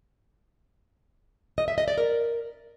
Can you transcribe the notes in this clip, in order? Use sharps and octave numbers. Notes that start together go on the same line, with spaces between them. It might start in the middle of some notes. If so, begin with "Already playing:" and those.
D#5
E5
D#5
D5
A#4